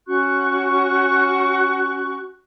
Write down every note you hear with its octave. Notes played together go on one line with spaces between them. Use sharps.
C#4 F#4 C#6 F#6